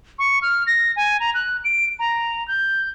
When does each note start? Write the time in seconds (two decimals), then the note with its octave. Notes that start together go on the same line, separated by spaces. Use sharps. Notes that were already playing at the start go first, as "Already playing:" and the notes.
0.19 C#6
0.42 F6
0.67 A#6
0.96 G#5
1.20 A#5
1.34 F#6
1.64 D7
1.99 A#5
2.48 G6